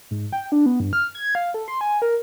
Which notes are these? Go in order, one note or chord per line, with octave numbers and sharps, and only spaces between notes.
G#2
G5
D4
B3
G2
F6
G#6
F5
A4
C6
G#5
A#4